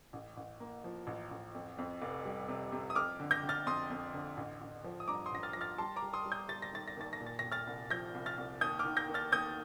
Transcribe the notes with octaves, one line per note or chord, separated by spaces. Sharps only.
A1
A1
A#3
F3
A1
A1
F2
F2
F1
G3
C3
C3
D#6
F2 D6 F6
D3
G6 A#6
D3
F6 A6
F2 C6 D#6
F2
D3
A1
A1
F3
D#6
G2 A#5 D6
C6 D#6
A1 A#6
F6 A6
F3 A#6
F6 A6
G3 A5 C6
A#5 D6
G3
C6 D#6
G3
D#6 G6
G3 A6
A#6
D#3 A6
A#6
D#2 A6
A#6
A#2
A6
A#6
A#2
F6 A6
C2
F3 G6 A#6
C2
F6 A6
C2
D#2 D#6 G6
D6 F6
D#3
G6 A#6
D#2
F6 A6
D#2 D#6 G6